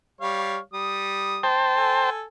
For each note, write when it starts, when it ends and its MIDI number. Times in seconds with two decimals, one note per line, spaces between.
0.21 0.57 55
0.21 0.57 73
0.21 0.57 77
0.73 1.45 55
0.73 1.45 87
1.43 2.10 72
1.43 2.10 79
1.43 2.10 81
1.75 2.24 69
1.75 2.24 80